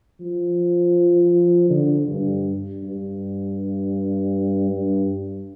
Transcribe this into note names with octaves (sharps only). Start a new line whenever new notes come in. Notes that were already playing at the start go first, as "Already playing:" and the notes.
F3
D3
G2
G2
G2